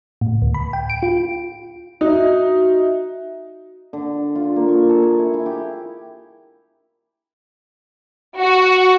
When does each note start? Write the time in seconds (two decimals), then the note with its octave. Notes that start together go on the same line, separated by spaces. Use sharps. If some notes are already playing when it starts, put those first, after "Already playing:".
0.21 A2
0.42 D2
0.54 B5
0.73 G5
0.90 D7
1.03 F4
2.01 D#4 F#4 E5
3.93 D3
4.35 F4
4.56 A#3
4.68 C#6
4.89 A4
5.03 G#4
5.19 E4
5.34 E4
5.46 G4
8.39 F#4